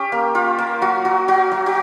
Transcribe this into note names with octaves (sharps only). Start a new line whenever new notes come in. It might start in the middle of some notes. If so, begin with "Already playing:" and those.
Already playing: C#4 G4
A#3
F4
A#3
F#3 F#4
F#3 F#4
F#3 F#4
F#3
F#4